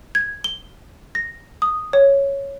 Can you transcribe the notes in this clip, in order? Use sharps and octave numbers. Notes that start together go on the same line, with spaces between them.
G#6
G7
A#6
D#6
C#5